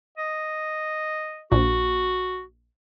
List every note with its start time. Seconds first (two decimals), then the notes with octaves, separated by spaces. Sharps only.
0.18 D#5
1.52 A#1 F#4